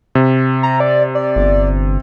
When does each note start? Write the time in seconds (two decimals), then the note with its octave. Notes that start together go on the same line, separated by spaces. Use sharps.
0.15 C3
0.63 A#5
0.80 D5
1.15 D5
1.36 G1